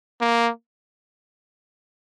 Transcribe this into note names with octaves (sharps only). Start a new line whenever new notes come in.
A#3